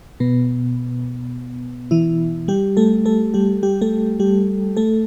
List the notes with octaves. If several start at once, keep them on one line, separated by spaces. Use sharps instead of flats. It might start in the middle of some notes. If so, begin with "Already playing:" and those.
B2 B3
E3 E4
G3 G4
A3 A4
A3 A4
G3 G4
G3 G4
A3 A4
G3 G4
A3 A4